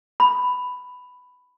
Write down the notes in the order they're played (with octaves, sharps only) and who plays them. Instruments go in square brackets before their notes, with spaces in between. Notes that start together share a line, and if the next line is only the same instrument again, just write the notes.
[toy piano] B5